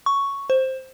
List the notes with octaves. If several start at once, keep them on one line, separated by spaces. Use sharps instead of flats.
C#6
C5